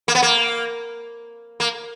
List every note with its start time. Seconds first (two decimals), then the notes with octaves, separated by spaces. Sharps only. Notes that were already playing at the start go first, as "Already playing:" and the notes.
0.08 A#3
0.15 B3
0.22 A#3
1.60 A#3